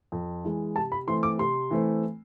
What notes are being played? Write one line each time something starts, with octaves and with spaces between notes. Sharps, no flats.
F2
E3 G#3
C3 A5
B5
E3 A3 C4 C6
D6
C3 C6
E3 A3 C4